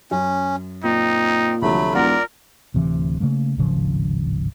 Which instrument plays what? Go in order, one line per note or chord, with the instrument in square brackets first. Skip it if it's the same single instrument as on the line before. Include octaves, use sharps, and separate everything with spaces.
[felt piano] F#2 [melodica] C#4
[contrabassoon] A#2 [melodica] C4 [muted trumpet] D#4
[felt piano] C2 D3 F3 [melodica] F#3 A3 B5
[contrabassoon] E1 [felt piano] F4 F#5 A#5 [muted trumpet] A#4 [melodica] D5
[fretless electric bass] D1 D2 C3 E3
C#3 F#3 A3 A#3
D1 G#1 C#3 F3